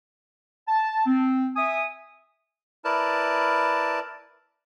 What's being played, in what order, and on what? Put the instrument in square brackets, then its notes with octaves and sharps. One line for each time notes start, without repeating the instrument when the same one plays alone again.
[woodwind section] A5
C4
E5 G#5 D#6
[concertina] E4 A#4 B4 D5 A5